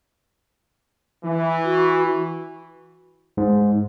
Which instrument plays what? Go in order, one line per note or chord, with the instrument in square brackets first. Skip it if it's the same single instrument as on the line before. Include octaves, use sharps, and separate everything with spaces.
[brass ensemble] E3
[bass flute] F#4
[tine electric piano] G#2